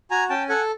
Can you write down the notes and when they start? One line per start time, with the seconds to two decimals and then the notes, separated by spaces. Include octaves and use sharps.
0.11 F#4 G#5 A#5
0.30 C#4 G5 A5
0.49 A4 F#5 G#5